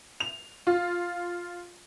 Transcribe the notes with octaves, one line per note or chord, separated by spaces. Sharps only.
F7
F4